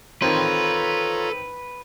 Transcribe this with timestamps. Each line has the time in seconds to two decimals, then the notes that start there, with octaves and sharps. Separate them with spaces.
0.22 D#3 C4 F4 A4 B4 C#5 A#5 C6